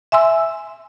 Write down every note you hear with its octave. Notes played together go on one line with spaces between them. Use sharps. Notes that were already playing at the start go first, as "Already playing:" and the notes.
E5 G#5 C6 E6